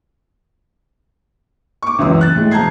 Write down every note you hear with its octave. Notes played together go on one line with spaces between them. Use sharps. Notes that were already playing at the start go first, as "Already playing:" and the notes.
C#6 D6
C#2 F#2 E3 D#6 E6
F#6 A6
A2 G#3
E1 A5 A#5 G6 G#6 C7